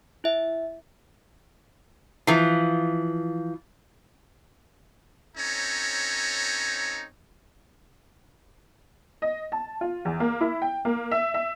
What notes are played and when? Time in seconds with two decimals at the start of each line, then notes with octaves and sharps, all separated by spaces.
0.24 E4 E5
2.27 E3 F3
5.37 C4 C#4 D#4 A4 C#5 A#5
9.22 D#5
9.52 A5
9.81 F4
10.05 E2
10.20 A#3
10.41 E4
10.62 G5
10.85 A#3
11.11 E5
11.34 E5